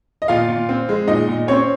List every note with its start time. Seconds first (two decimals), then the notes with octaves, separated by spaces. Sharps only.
0.22 D#5
0.28 A#2 F4 F5
0.49 A#2
0.69 C4
0.89 G#3
1.07 A#2 D#4 D#5
1.28 A#2
1.47 C4 C#4 C#5